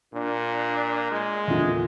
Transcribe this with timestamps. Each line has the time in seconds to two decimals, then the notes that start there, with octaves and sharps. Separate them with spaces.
0.14 A#2 D4
1.12 G#3
1.48 E2 A#2 D3